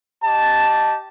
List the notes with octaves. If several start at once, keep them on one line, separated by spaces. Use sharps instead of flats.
G4 D#5 A5